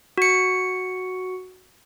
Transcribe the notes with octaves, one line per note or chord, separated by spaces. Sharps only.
F#4 C#7